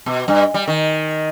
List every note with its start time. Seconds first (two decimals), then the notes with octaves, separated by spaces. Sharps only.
0.06 B2
0.28 G2
0.54 G3
0.68 D#3